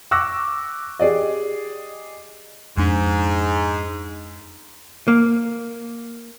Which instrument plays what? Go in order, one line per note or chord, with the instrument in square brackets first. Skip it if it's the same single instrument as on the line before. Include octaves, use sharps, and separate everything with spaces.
[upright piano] C#6 D6 E6 F#6 A#6
G4 G#4 D5 D#5
[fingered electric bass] F2 G#3 D4 [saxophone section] G#2
[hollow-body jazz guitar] A#3